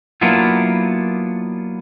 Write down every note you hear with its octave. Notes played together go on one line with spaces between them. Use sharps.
F#3 A#3 B3 D4 E4 F4